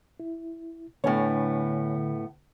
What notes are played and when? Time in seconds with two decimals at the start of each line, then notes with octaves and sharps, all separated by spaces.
0.20 E4
1.04 A2 D3 B3 C#5 G#5 C#6